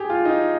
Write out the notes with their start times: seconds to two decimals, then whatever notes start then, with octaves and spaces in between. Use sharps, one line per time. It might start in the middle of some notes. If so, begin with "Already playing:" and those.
Already playing: G4 G#4
0.10 F4
0.25 D#4